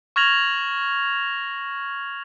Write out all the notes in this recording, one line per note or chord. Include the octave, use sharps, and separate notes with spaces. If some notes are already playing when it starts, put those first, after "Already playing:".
C#6 F6 G#6 A#6 F7 F#7